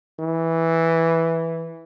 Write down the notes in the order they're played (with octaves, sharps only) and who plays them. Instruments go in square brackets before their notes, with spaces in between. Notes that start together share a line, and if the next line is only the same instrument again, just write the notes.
[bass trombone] E3